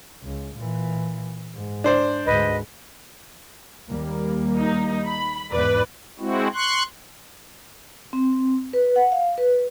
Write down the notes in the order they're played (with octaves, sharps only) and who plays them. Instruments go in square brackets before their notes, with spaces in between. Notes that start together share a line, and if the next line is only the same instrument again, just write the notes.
[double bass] C#2
A#2 E3
G#2
[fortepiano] D4 C5 D5
[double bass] D2 G#2 [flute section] B4 D#5
[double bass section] D#2 G3 A#3
[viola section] D#4
B5
[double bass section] E2 G#2 E3 [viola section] B4 D5
[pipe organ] G#3 C4 E4 F#4
C6 C#6 F#6
[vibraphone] C4
B4
F#5
F5
B4